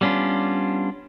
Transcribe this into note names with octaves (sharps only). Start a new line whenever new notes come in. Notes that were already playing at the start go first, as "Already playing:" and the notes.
G3 B3 C#4 D4 F4